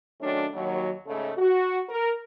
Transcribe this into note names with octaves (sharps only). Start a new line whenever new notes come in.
D#3 F#3 A3 C#4 D4
D#2 F#3
G#2 C#3 A3
F#4
A#4